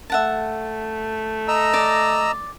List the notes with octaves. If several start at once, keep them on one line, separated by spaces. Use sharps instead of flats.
A3 E5 F#5 A5
D#5 A#5 E6
D5